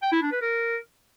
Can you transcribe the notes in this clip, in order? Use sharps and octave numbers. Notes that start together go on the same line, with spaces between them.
G5
E4
D4
B4
A#4